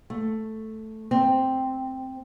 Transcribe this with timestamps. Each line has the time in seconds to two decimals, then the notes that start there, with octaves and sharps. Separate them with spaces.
0.10 A3
1.11 C4